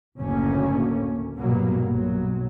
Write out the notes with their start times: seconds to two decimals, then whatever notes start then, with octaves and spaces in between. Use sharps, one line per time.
0.20 F#1 D2 A2 A3 A#3 C#4
1.38 A#1 G2 B2 F#3 A#3 B3
1.92 B1 F#3